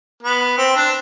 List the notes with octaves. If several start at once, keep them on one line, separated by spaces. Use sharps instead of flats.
B3
C4
D4